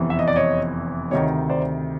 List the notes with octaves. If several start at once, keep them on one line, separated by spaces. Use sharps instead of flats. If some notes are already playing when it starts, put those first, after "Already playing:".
Already playing: F1 E2 C3 E3
E5
D#5
D5
C#5 D#5
D2 C3 D#3 C#5 D#5
C5 D5